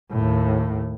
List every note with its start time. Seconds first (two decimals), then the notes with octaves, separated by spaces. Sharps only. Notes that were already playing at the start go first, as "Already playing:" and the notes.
0.12 D#2 A2